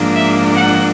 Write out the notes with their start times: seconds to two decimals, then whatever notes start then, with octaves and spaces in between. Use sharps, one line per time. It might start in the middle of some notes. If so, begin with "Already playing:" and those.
Already playing: G#2 F3 A#3 D4
0.14 E5
0.53 F#5